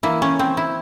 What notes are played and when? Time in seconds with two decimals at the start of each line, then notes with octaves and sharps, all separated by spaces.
0.03 E3 A#3 E4
0.22 C#4
0.39 C4
0.57 E4